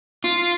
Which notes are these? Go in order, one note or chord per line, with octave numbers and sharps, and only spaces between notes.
F4